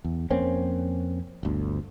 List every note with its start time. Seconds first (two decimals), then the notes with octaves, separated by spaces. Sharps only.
0.05 E2
0.31 F2 A#3 C4 C#4
1.43 G1 D2